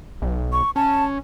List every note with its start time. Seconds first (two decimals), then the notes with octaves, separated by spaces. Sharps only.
0.22 B1
0.52 C#6
0.76 C#4 A5